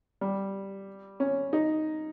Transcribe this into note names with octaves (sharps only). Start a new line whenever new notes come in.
G3
C#4
D#4